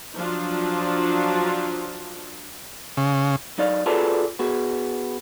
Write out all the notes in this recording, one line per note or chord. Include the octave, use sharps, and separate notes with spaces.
F3 F#3 D4 F4
C#3
F#3 D#4 D5 F5
F4 F#4 G#4 A4 B4 D5
B3 F#4 G#4